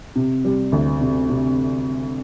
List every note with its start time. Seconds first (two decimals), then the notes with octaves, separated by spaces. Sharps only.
0.16 C3
0.45 G3
0.72 D2
1.01 C3
1.30 C3